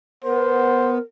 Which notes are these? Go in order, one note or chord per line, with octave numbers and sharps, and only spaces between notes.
B3 A#4 C5